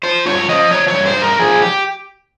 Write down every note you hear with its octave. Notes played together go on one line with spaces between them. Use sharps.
F3 C5
G2 C#5
F3 D#5
F3 C#5
C#5
G2
C5
G2
A#4
F3 G#4
G4